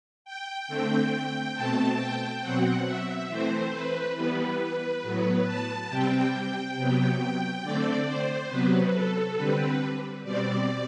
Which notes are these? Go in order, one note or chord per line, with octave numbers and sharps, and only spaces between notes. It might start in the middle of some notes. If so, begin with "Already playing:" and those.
G5
D3 A3 C4
B2 A3 C4 A5
G5
B2 F#3 C4 F#5
E5
E3 A3 C4 C5
B4
E3 G3 B3 B4
A2 F#3 B3
A5
C3 G3 C4 G5
C3 F#3 B3
G5
D3 A3 C4 D5
C5
C3 F#3 B3 B4
A4
D3 G3 C4 B4
B2 G3 C4 D5